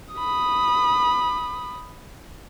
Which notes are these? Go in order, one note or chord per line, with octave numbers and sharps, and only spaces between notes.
B5 D#6